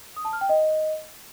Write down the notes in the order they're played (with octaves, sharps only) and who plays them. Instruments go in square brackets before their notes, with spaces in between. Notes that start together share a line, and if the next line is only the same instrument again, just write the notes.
[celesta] D#6
A5
F6
G5
D#5